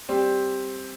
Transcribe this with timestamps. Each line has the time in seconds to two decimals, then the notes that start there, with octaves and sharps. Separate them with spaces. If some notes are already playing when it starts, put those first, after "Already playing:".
0.09 G3 C4 G4